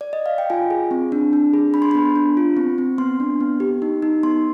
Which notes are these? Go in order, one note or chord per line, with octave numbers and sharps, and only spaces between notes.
D5
D#5
F5
G5
F4 G#5
G#4
C4
D4
D4
G#4
D4 B5
C6
B3 B5
D4
F4
C4
C4
B3 C6
D4
B3
G4
D#4
D#4
B3 C6